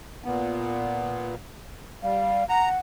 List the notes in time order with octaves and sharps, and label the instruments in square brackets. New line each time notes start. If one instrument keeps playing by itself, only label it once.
[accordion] A#2 B3
[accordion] G3 [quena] F5
[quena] F#5 [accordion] A#5